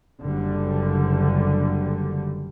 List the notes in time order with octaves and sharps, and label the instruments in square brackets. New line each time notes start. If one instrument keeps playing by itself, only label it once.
[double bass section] F#1 D3 G3